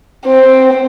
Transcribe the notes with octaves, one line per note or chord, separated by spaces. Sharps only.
C4